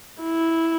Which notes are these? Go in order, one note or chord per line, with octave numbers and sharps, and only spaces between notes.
E4